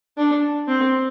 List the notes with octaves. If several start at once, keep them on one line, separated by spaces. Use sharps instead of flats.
D4
C4